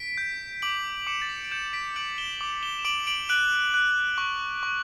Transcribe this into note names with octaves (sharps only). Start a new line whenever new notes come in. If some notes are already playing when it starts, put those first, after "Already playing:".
Already playing: B6 D7
G6
D6 D7 F#7
D6 C#7 E7
A6
B6
C#7
D7
G6 C#7 E7
B6 D7
G6 D7 F#7
E7 G7
D6
E7 G7
E7
D6 D7 F#7
D7 F#7
F#6 D7 F#7
F#6
C#6
C#6